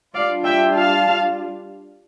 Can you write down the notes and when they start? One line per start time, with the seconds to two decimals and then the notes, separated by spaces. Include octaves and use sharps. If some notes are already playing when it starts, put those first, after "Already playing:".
0.14 G3 D4 F4 D5 F5
0.45 E5 G5
0.75 F5 A5